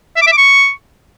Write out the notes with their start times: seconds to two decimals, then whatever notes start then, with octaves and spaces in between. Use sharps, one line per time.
0.16 E5
0.22 D6
0.27 E5
0.32 D6
0.37 C#6